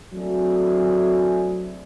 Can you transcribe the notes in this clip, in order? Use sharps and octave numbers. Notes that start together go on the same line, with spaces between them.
F#3 A3 C4 D4 E4 G#4